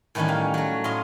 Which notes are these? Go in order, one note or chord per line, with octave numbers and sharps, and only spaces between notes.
A2 D#3 E3 G3 C#4 D#4
F5
F#3 A3
A2 D#5 F5 C6